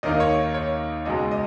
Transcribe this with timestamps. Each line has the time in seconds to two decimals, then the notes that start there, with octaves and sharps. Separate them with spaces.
0.03 D#2 D#3 A#3 D#4 D#5
0.20 C#5
0.54 C#5
1.05 C#2 B2 G#3 D#5
1.31 D#5